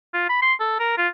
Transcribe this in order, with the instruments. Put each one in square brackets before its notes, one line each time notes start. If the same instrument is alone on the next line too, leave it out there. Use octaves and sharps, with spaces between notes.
[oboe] F4
B5
C6
A4
A#4
F4